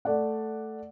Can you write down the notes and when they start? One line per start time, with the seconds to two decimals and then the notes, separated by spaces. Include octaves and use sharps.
0.05 A3 D5 F#5